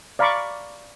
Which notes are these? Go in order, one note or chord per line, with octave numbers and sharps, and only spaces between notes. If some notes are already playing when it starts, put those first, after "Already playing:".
D5 F5 A#5 B5 C#6 D6